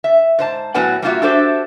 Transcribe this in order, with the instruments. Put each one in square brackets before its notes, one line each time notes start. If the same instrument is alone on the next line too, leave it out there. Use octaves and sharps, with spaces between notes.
[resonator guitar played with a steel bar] E5
G#2 C5 A5
A2 F#3 B3 B4 F#5 G#5
G3 A#3 D4 F4 F#4 E5
D4 F#4 G4 A4 C5 E5